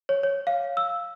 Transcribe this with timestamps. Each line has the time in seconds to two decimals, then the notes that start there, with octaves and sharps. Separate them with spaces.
0.09 C#5
0.23 C#5
0.47 F5
0.77 E6